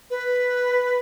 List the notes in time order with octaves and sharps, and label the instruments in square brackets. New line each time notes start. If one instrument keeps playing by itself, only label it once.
[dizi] B4